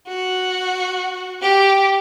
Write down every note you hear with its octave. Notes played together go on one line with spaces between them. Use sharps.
F#4
G4